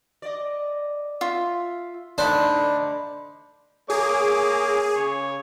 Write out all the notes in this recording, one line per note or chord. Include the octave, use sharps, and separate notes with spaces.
D5 D#5
F4 E5
D3 A3 D4 D#4 C5 B5
A#3 G#4 C#5 D6
C#3 C#5